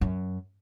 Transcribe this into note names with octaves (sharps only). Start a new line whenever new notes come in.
F#2